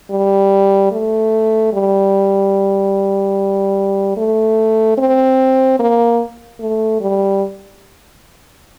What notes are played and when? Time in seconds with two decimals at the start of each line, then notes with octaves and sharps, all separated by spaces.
0.11 G3
0.91 A3
1.73 G3
4.17 A3
4.98 C4
5.79 A#3
6.60 A3
7.01 G3